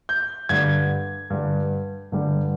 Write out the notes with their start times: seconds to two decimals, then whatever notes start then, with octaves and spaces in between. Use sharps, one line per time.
0.09 G6
0.49 G2 D3 G3 G#6
1.30 G2 D3 G3
2.12 G2 D3 G3